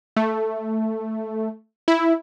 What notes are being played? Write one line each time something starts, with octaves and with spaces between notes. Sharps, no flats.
A3
E4